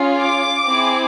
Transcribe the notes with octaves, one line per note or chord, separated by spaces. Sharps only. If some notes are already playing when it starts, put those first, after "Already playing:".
Already playing: C#4 F4 G#4
D6
C4 E4 G#4